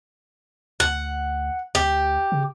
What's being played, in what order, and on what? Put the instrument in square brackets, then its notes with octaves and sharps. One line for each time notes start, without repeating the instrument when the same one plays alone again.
[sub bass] D2 [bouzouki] F#5
[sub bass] D2 [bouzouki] G4
[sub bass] C#3